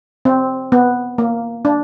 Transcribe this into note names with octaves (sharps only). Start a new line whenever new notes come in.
C4
B3
A#3
D4